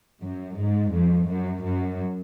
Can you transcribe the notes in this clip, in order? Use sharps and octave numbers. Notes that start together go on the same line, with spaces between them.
F#2
G#2
F2
F#2
F#2